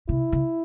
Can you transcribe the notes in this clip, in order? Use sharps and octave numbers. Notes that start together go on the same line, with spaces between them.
C3 E4
C#3